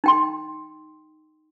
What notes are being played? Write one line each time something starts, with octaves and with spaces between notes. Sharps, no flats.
D#4 G5 C6